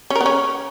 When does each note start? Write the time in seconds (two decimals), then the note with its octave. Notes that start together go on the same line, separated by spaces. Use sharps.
0.10 C#4
0.15 A#4
0.21 B3
0.26 C#4